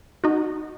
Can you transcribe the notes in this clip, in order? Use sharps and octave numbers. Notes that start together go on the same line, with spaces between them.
D#4 F#4